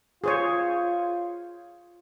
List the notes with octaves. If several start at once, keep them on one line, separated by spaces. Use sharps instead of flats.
F4 G#4 C5 C#5